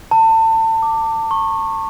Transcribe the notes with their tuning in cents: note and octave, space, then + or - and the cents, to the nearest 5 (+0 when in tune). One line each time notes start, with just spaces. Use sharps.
A5 +30
D6 +5
C#6 -25